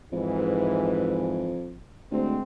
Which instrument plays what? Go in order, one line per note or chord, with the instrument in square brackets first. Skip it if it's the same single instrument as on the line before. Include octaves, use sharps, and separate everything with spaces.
[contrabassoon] F2 [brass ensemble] G#2 E3
[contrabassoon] D2 [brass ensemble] G#3 C4